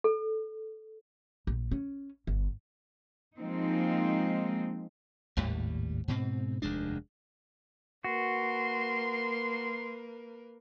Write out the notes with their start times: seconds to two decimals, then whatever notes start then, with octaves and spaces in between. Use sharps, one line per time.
0.04 A4
1.47 A#1
1.72 C#4
2.27 G1
3.37 F3 G#3 A#3 C4 D#4
5.37 G#1 D#2 A2 G3
6.08 G#2 B2 C4
6.62 F1 D#2 G#3 D4
8.04 A#3 F#4 A#4 B4 C6